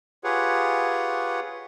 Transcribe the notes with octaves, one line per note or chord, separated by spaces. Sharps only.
F4 G4 G#4 B4 C#5 F#5